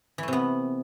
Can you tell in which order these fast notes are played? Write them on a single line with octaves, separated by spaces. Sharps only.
E3 A3 C3 B3